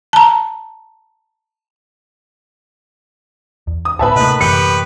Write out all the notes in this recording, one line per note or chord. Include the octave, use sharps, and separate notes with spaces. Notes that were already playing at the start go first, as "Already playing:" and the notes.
A5 A#5
E2
D#6
D1 B3 B4 E5 G#5 A5 B5
A2 C3 A#3 D#4 B4
F#2 C3 E3 G4 B4 C#7